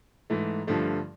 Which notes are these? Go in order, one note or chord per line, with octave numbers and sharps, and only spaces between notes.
G#2 E3 A3
G2 D3 F3 A3